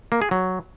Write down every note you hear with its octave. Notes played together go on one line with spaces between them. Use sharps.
A#3
G#4
F#3